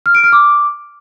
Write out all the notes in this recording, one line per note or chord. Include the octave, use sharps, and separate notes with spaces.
F6
D7
F6
D6